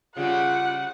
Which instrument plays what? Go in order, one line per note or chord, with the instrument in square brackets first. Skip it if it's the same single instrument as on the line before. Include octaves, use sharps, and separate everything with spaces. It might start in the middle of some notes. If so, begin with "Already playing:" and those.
[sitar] C#3 G3 [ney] F4 [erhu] F#5